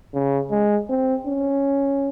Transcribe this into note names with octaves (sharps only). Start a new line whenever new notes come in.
C#3
G#3
C4
C#4